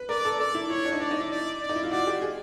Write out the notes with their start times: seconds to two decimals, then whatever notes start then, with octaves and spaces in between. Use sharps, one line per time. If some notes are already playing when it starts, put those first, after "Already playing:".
Already playing: B4
0.09 A#4 D5
0.25 A4
0.39 A4 D5
0.55 E4
0.70 E4 C#5
0.85 D4
0.92 D#4
1.00 D4 D5
1.11 D#4
1.20 E4
1.30 D5
1.61 D5
1.69 D#4
1.76 E4
1.83 F4
1.91 F#4 D5
2.07 G4
2.22 G#4